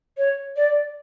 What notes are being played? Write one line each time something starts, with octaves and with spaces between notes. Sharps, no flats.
C#5
D5